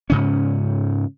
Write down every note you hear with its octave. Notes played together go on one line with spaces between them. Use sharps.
G#2 C#3 C#4